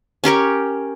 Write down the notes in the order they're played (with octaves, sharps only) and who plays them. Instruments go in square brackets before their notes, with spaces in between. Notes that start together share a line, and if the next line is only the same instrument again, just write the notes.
[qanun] C#4 G4 A#4 C#5